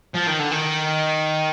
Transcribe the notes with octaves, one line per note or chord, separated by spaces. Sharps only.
F3
D#3
D3
D#3